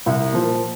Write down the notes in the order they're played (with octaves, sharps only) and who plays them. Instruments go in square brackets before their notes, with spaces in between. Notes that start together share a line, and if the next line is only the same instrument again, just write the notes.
[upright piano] C2
A#2 F3 A#3